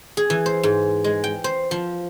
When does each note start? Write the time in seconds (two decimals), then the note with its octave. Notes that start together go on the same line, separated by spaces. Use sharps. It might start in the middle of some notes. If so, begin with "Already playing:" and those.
0.17 G#4
0.30 E3
0.46 C5
0.63 G#2
1.04 G#3
1.24 G5
1.44 C5
1.71 F3